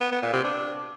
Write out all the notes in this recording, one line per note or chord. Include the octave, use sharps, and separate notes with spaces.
B3
B3
A#2
C3
D4